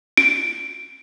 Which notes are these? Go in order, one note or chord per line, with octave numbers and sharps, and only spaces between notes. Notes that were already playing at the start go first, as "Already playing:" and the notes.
D7